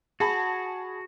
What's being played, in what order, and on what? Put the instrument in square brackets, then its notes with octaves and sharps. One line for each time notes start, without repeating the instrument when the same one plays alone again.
[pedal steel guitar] F#4 [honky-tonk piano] G#4 A5 B5